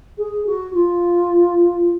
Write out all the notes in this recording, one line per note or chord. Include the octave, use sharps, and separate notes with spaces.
G#4
F#4
F4